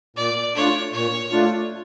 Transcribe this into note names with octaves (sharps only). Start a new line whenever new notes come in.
A#2 D5
A3 D4 F4 C#5
A#2 C#5
A3 D4 F4